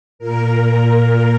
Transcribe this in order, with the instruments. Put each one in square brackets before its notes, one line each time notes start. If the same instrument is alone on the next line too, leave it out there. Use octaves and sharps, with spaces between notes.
[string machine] A#2 A#4